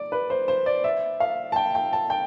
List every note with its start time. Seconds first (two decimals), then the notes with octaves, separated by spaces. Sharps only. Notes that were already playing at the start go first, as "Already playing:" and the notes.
Already playing: D5
0.12 B4
0.30 C5
0.48 C5
0.66 D5
0.84 E5
1.20 F5
1.52 A5
1.56 G5
1.75 G5
1.93 A5
2.10 G5